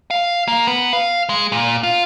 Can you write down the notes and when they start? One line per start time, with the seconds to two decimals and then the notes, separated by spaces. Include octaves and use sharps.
0.11 F5
0.48 A#3
0.67 B3
0.93 F5
1.29 G#3
1.52 A#2
1.83 F4